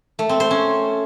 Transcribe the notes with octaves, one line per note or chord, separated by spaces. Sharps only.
A3
C4
C5
C#4